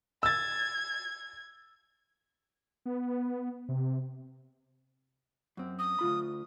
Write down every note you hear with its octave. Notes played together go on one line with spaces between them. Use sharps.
E6 G#6 A6
B3
C3
F#2 C4
D#6
D2 F4 B5